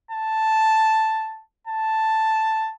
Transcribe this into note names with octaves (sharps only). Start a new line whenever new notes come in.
A5
A5